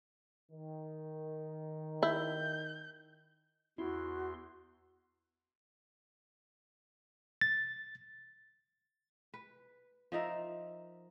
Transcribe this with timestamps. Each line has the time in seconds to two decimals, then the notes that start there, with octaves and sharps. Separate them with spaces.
0.52 D#3
2.03 E4 G6
3.78 E2 E4 F#4 C6
7.41 A6
9.34 B4
10.12 F3 D#4 A#4 E5